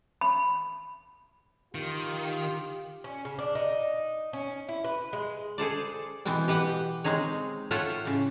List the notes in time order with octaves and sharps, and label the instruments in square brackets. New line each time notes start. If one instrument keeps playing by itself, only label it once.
[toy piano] B5
[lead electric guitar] D#3 [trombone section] F4 G4
[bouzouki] C#4
C#3
D4
D#4
C#4
E4
B4
G#3
[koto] G#4 A4 C5 D5
B2 E3 B3 C4 G5
G4 B4 F#5 G5
G#3 C4 D#4 G#4 C#5
F4 A4 C#5 E5 F#5 G5
A2 C#3